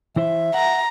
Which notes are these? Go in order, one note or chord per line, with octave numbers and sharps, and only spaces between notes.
E3 E4 C5 E5
F#5 A#5